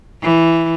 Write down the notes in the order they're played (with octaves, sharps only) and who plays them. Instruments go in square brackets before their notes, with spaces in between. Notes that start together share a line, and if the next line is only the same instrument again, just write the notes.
[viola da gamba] E3